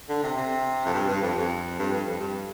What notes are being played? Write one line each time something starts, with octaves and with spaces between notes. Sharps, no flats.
D3
C3
C3
F2
G2
G2
F2
F2
G2
G2
F2
G2